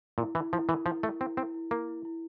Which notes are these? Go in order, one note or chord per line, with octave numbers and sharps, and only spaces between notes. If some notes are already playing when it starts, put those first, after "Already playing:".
A#2 E4
E3 E4
F3 E4
E3 A#4
F3 E4
A3 A#4
C4 E4
C4 E4
E4
A#3 E4
E4
E4